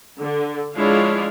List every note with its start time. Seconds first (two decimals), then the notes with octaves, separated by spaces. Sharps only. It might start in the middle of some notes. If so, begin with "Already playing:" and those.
0.18 D3
0.76 F3 G#3 D4 E4 C#5 F5